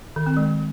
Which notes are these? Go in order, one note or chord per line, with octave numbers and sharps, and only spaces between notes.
D#3
C4
G#3